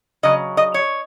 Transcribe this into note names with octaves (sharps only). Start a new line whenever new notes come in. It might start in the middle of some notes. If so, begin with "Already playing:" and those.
C#3 F#3 D#5
D#5
C#5